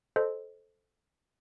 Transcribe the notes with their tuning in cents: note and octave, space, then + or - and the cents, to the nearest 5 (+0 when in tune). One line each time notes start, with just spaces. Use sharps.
A4 -5 C5 +0 D#5 -20